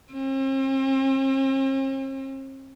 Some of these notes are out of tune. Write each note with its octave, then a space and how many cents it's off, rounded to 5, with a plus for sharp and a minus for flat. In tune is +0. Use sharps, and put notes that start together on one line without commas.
C4 +45